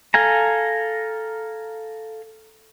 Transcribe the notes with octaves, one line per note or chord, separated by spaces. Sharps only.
A4 F5 G#5 A#5